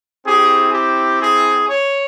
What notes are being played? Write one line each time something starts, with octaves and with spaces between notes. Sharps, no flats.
C4 E4 G4 G#4
G4
G#4
C#5